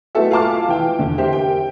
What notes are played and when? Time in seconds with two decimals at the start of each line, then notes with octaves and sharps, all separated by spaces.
0.15 A3 B3 E4 F#4 A4 E5
0.31 F4 F5 G#5 A5 D6 F6
0.69 E3 G5
0.99 E2 D3
1.18 G4 A#4 C5 E5
1.33 G5